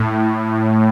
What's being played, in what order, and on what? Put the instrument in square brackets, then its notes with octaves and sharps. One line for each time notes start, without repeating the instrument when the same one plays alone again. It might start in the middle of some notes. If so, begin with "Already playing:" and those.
Already playing: [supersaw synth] A2